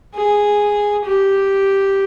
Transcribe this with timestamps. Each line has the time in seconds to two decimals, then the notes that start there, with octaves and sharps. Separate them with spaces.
0.15 G#4
1.05 G4